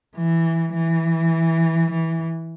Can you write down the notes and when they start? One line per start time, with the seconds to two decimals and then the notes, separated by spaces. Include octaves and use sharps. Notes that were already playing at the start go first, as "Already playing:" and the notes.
0.16 E3
0.74 E3
1.91 E3